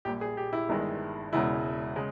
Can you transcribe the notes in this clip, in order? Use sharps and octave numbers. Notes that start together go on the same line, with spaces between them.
A#1 A#2 G3 G4
G#4
G4
E4
G1 G2 D#3 G#3
E1 E2 C#3 E3 G#3 E4
C#3 G#3